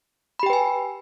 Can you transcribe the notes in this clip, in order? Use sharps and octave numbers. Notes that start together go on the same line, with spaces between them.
G4 B4 G5 G#5 B5